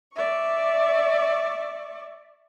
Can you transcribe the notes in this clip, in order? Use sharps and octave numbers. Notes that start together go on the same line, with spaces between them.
D5 E5 C#6